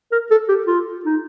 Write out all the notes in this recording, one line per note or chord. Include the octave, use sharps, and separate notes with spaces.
A#4
A4
G4
F4
D#4